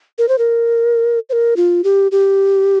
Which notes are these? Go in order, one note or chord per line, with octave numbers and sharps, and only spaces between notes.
A#4
C5
A#4
C5
A#4
F4
G4
G4